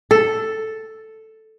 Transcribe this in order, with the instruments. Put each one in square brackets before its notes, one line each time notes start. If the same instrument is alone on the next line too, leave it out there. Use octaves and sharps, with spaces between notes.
[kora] A4